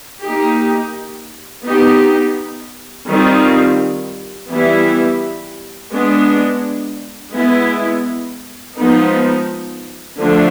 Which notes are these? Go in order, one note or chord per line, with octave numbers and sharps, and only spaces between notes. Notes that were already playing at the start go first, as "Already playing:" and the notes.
A#3 D#4 G4
B3 D#4 G4
D#3 G3 C4 F4
E3 G3 B3 E4
G#3 B3 D4
G#3 B3 E4
F3 G#3 B3 D#4
D3 F3 A3 D4